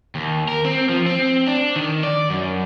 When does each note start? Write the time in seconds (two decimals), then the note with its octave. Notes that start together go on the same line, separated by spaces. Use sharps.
0.15 D#2
0.48 A#4
0.65 C4
0.89 F3
1.06 C4
1.48 D4
1.76 D#3
2.03 D5
2.30 F#2